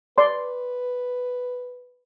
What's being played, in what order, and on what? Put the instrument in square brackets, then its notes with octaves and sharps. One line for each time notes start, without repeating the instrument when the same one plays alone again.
[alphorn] B4 [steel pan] D5 C6